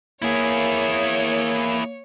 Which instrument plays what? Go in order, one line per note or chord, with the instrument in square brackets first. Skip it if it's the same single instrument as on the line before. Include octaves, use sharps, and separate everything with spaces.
[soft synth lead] A#3 [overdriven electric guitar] E4 G#4 [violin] C#5